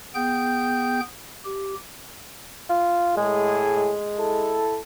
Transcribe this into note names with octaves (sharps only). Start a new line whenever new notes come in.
B3 G#4 G5 G6
G4
F4
A2 G#3 G#4
G#3
E4 A4